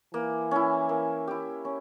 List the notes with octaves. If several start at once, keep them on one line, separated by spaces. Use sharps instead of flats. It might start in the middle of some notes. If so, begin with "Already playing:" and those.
E3 A#3
C#4 E4
A#3
E4 G4
C#4